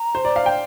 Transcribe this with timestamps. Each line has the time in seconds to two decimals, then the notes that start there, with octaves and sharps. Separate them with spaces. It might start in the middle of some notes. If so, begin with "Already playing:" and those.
Already playing: A#5
0.15 C5
0.25 D5
0.36 F5
0.46 G5